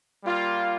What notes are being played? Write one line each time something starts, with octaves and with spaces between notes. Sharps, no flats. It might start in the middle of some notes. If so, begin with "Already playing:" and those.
G3 A#3 F4